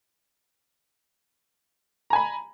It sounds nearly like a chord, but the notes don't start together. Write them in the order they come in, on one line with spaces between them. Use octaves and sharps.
A#5 G#5 B5